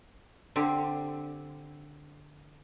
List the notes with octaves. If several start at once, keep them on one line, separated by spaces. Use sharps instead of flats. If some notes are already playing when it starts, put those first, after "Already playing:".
D3 C4 G4